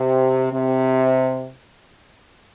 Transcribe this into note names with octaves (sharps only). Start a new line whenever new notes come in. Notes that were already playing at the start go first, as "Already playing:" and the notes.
Already playing: C3
C3